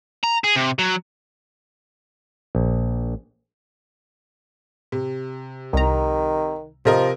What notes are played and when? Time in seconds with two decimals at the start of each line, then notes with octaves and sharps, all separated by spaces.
0.23 A#5
0.44 G#4
0.56 C3
0.79 F#3
2.55 A#1
4.92 C3
5.73 C2 D#3 A#5
6.85 C3 F3 A#4 D#5